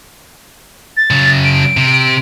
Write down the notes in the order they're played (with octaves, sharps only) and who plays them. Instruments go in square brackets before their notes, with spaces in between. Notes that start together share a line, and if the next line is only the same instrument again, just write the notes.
[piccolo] A6
[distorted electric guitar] C#3 F#3
[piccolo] D7
[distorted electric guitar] C3